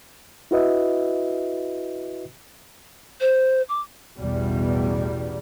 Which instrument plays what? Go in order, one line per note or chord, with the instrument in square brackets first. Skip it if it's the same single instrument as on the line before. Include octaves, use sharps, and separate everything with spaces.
[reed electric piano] E4 F#4 B4 D#5 E5
[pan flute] C5
D6
[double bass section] A1 E2 B2 G3